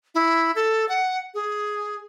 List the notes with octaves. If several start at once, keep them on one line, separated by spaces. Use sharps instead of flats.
E4
A4
F#5
G#4